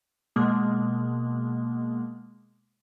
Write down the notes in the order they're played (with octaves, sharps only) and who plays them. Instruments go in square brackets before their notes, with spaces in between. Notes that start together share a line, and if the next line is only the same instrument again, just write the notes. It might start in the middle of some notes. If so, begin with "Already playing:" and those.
[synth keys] B2 G#3 A#3